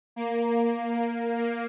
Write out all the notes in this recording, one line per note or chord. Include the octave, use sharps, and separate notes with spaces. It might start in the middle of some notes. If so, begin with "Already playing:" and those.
A#3
A#3
A#3